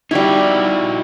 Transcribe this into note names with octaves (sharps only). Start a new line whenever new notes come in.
G3 D#4 E4 F#4